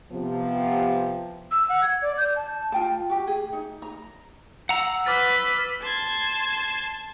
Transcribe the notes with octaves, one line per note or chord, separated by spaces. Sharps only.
C3 F3 B3
E6
F#5
G#6
D5
G6
A5
F4 G5 A5
F#4 G4
G#4
D#4
A#5
F#5 A#5 E6
B4 D6 F6 A6
A5 C6 G#6